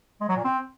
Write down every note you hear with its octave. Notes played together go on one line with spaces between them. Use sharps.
G#3
F#3
A#2
C4